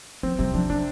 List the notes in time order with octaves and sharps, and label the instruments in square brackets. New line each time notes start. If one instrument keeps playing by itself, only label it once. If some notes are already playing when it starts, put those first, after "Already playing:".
[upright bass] F3 [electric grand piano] C4
[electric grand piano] C3 [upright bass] G3
[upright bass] F3 [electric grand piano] D4
[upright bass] F3 [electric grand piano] D4